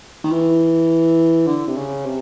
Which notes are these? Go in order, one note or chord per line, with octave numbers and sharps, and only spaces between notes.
D#3
E3
D3
C3
C#3
C3